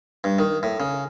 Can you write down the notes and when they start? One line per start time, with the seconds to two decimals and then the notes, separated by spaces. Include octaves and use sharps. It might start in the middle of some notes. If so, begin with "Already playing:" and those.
0.24 G2
0.39 D#3
0.63 A2
0.80 C#3